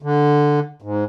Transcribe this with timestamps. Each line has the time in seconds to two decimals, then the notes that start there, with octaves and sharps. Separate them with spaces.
0.02 D3
0.82 G#2